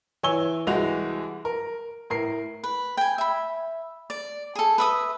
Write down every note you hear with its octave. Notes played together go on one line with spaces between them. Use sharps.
E3 C#5 G#5 E6 G7
C2 E3 G#3 F#4 F7
A#4
A2 A#4 C7
B4
G5 G#5
E5 B5
D5
G#4 A4
B4 E5 D#6